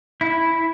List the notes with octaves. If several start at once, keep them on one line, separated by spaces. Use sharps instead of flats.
E4